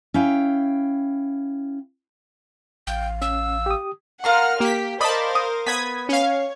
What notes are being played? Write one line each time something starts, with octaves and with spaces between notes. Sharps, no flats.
C#4 E4 F5 G5
A1 F5 G5
C#4 E6
G4 D#6
F4 A#4 F#5 C6 F6
A#3 G4 B6
A#4 C5 D5 D#5 F5 A5 B5
D#6
B3 B5 D#6 G#6 B6
C#4 C#5 F5